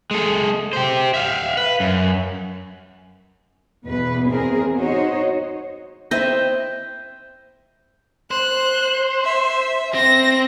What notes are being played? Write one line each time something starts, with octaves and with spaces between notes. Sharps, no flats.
G#3 A4
G4 C5
E5 F5
B4
F#2
E2 B2 B4
E2 C4 G#4 A#4
D#4 F#4 C5 C#5 D#5
C4 E4 C5 D#5 E5 G5
C5 F#6
E5
C4 A#6